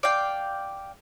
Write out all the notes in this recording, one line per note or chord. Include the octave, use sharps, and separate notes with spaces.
D5 F5 G5